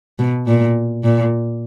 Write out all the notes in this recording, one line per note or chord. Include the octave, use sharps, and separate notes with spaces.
B2
A#2
A#2